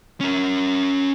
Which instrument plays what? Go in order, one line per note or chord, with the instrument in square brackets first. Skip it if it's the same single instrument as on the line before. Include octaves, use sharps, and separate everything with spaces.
[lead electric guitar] C#4 A#4